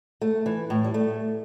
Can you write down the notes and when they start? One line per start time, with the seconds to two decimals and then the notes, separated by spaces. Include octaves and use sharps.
0.21 A3
0.46 E3
0.70 A2
0.84 G3
0.94 A3